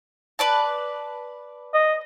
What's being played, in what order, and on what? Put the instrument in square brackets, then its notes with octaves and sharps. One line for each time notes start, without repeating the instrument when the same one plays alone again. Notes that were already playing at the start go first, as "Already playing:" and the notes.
[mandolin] B4 D5 A5
[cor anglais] D#5